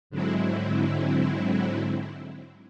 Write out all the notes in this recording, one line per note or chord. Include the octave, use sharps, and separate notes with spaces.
G#2 D3 F#3 G#3 C4 E4